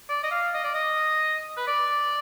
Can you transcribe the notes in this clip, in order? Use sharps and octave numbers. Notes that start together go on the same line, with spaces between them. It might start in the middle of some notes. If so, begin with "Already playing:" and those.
D5
D#5
F5
D#5
D5
D#5
B4
D5